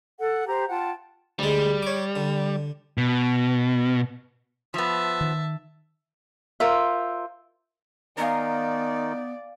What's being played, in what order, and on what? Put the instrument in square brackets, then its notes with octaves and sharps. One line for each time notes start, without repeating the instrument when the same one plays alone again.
[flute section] A4 F#5
G4 C5 A#5
F4 F#5 G5 A5
[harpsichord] D2 G#3 [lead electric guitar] G3
[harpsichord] C#5 D6
D3
[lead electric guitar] B2
[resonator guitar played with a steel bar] F3 B3 [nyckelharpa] E5 A5
[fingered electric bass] D#3
[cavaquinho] F4 A#4 C5 E5
[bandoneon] D#3 D#4 [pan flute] B3 [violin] D5 [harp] F5 G#5 A#5